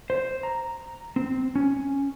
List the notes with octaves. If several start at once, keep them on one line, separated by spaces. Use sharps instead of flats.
C5
A#5
C4
C#4